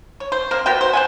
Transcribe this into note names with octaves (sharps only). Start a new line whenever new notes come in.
C#5
C5
A#3 C4 A#4
B3 F#4 A#4 G5
C5
C5 F#5 G#5